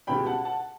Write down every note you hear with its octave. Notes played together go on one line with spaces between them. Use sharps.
C#2 B2 G3 G5 B5
F#5 A5
F#5 A5